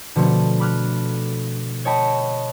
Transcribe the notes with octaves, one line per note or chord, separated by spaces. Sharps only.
B2 D3 F3 A3
B5 D6 F6 F#6
C#5 D#5 G5 A5 B5